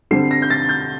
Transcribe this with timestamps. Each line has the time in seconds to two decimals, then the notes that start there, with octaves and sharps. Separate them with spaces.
0.11 D3 G3 C4 C7
0.31 A#6
0.42 G6
0.50 A6
0.69 G6